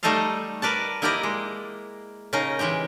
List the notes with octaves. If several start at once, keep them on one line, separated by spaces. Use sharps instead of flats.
G3 A3 D#4 A4 D#5 F5
A#4 B4 D5 A5
A#3 E4 G4 A#4 D5 D#5
G#3
C#3 C#4 D#4 A#4 D#5
E3 G#3 G4 G5